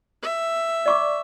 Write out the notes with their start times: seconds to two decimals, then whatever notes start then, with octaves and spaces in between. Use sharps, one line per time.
0.23 E5
0.86 D5 C#6 D6